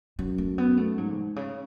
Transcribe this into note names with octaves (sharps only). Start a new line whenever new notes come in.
F#2 F#3
A3
B3
A3
G#2 F#3
B2
C#3